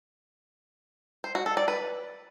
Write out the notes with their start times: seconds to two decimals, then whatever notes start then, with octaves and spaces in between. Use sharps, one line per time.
1.24 C5
1.35 F#4
1.46 A4
1.57 D5
1.68 B4